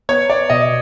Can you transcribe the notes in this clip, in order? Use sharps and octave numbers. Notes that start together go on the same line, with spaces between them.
B3 C#5
D5
B2 D#5